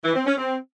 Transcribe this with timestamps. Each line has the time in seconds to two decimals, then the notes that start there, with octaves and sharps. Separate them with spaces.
0.05 E3
0.16 C4
0.27 C#4
0.38 C4